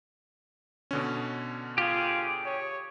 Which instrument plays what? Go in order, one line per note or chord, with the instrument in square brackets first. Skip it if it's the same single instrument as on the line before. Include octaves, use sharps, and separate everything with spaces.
[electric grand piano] B2 D3 C#4
[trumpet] F4 [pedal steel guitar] G4 G#4
[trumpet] C#5